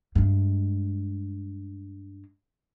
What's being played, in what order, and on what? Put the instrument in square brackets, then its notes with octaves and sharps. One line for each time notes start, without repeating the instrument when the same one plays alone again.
[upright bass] G2 G#3